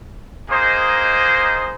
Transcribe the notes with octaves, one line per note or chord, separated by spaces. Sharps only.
A#3 D#4 G#4 C5 D#5